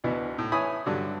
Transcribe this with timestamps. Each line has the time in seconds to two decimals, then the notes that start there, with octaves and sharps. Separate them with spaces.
0.04 D2 B2 E3
0.38 A2
0.52 E3 E4 C#5 G#5 B5 D#6
0.86 G2 D3 F#3